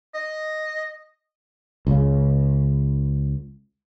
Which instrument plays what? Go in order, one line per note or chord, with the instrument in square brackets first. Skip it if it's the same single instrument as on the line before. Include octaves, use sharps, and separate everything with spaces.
[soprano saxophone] D#5
[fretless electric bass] C#2 C#3